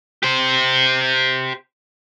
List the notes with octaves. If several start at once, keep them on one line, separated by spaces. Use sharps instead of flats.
G4 C5